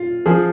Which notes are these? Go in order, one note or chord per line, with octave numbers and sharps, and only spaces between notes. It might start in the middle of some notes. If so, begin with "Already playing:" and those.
Already playing: F4
F3 G#4